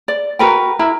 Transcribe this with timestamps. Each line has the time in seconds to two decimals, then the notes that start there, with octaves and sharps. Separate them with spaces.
0.08 D5
0.39 F#4 A#4 B4 G5
0.79 E4 A#4 A#5